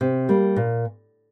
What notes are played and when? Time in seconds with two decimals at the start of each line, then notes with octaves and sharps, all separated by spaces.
0.01 C3
0.29 G3 A#3
0.56 A#2